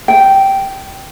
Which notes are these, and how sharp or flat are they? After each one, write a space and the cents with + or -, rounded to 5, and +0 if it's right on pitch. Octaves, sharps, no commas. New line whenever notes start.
G5 -10